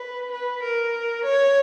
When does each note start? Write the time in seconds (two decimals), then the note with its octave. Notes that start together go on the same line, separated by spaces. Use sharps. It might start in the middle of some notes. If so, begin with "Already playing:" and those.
Already playing: B4
0.32 B4
0.62 A#4
1.24 C#5